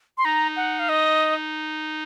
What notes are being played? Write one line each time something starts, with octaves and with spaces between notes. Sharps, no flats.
C6
D#4 A#5
F#5
F5
D#5